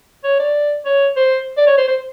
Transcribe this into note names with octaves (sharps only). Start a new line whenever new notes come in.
C#5
D5
C#5
C5
D5
C#5
C5
C5